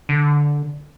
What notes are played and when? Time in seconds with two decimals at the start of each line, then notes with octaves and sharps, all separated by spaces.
0.09 D3